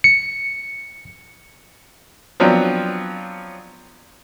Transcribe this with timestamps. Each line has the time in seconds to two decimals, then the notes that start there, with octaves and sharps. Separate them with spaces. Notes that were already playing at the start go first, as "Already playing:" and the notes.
0.04 C#7
2.40 F3 F#3 B3 C4 D4